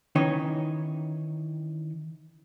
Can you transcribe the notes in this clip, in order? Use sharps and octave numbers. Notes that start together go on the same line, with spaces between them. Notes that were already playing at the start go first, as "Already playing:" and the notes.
D#3 E3 C#4 D#4 C#5 D#5